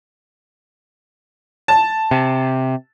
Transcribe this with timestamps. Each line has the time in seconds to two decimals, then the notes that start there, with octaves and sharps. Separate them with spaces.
1.68 A5
2.11 C3